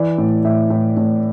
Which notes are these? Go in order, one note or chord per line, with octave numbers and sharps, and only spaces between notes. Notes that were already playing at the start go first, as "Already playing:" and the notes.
Already playing: E3 D5
A2
A2 E5
A2
A2